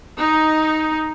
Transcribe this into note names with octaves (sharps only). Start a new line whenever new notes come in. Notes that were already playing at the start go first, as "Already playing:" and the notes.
D#4